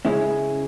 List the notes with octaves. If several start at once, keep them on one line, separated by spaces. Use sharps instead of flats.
C#3 G#3 C#4 E4 G#4